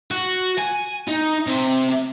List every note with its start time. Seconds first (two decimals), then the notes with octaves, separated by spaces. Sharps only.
0.11 F#4
0.58 G#5
1.08 D#4
1.47 C3